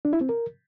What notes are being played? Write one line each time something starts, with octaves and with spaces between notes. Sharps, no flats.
D4
E4
C4
A#4